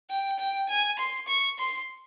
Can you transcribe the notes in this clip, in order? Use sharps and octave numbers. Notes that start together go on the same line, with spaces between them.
G5
G5
G#5
C6
C#6
C6